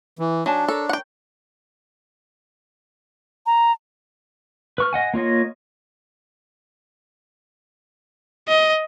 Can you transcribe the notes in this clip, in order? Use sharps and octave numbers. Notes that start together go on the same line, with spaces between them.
E3
F#3 D4 D#4 G#5 A5
A4 A#4 C#5
F#5 G5
A#5
B4 C#6 F6
D#5 F#5 G#5
A#3 F4 C#5 D#5
D#5